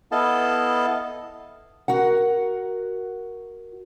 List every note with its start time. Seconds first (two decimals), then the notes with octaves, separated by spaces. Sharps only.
0.12 B3 E4 A4 D#5 F5 A5
1.88 F#4 A#4 F#5